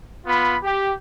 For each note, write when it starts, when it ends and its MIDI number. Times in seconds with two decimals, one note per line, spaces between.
0.27 0.57 59
0.27 0.57 65
0.27 0.57 83
0.64 0.92 67